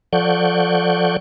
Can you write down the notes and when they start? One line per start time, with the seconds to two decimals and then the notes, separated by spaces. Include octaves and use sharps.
0.13 F3 A4 D5 F#5 C#6 G6